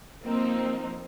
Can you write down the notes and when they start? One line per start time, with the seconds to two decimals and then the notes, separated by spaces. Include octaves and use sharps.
0.23 F3 A#3 C4 D#4